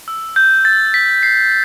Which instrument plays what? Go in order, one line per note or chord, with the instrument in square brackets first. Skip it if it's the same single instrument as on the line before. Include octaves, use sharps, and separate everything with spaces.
[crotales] E6
G6
A6
B6
C7